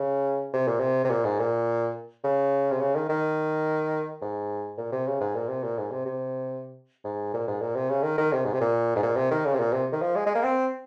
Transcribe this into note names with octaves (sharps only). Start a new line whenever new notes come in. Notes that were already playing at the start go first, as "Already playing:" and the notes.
Already playing: C#3
C3
A#2
C3
C3
A#2
G#2
A#2
C#3
C3
C#3
D#3
D#3
G#2
A#2
C3
C#3
G#2
A#2
C3
A#2
G#2
C3
C3
G#2
A#2
G#2
A#2
C3
C#3
D#3
D#3
C3
G#2
C3
A#2
G#2
A#2
C3
D#3
C#3
C3
A#2
C3
D#3
F3
G#3
G#3
A#3
C4